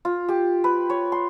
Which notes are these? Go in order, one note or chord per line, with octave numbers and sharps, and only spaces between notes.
F4
G4
B4
C#5
C6